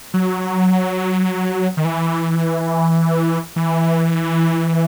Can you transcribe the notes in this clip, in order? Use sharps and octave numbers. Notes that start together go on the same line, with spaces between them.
F#3
D#3
E3
E3